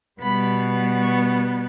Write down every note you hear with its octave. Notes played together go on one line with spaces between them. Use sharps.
B2 G3 B3 B5
C#6